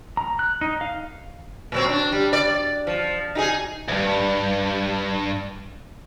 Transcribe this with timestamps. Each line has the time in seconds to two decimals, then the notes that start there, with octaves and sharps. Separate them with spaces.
0.17 A#5
0.39 F#6
0.61 D#4
0.81 F5
1.72 A#2 F#3 C4
1.89 D4
2.12 G3
2.33 D5
2.87 F3
3.35 D#4 G4 G#4
3.88 D2 G2